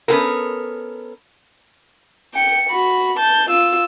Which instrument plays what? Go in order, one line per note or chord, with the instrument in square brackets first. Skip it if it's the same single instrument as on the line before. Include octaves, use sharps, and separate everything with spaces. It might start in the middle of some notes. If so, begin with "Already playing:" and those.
[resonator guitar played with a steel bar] B3 C#4 F4 F#4 A4 A#4
[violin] G5 C#7
F#4 B5
A5 G6
F4 E6